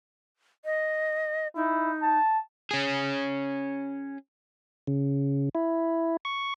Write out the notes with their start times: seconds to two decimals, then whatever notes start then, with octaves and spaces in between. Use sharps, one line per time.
0.65 D#5
1.56 D#4 E4
2.02 A5
2.71 C#4 G#4
4.87 C#3
5.55 E4
6.25 C#6